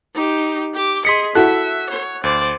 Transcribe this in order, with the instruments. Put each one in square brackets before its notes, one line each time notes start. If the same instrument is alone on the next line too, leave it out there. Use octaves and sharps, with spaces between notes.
[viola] D#4 G4
G4 D6
[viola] G#4 D#5 [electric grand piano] C6 B6 C#7
[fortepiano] E4 F#4 A4 [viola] E5 [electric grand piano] F#6
[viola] C#5
[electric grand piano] D2 [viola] C5 D5